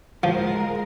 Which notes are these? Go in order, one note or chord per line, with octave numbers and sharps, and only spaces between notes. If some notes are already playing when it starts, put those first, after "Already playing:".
F3 G#3 A#4